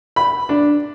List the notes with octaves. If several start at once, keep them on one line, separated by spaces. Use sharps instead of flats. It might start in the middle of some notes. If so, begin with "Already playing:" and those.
B5
D4